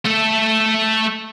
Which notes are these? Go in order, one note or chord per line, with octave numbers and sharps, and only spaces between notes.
A3 A4